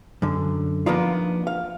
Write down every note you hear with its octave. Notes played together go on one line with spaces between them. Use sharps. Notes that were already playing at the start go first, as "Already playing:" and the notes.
F#2 D3
F3 A#3 B3 D4 D#4 F4
F5